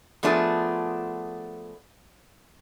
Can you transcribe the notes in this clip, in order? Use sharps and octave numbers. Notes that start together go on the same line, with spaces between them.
F3 A3 B3 D4 F4 G#4